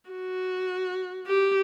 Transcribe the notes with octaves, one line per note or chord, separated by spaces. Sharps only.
F#4
G4